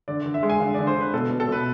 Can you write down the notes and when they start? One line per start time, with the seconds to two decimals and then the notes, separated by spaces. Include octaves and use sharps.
0.08 D3 D5
0.26 D3
0.34 E5
0.43 G#3
0.49 G#5
0.60 D3 F5
0.74 D3 D5
0.87 C5
0.95 D3
1.01 B4
1.14 B2 A4
1.30 B2
1.40 A4
1.48 B2 B4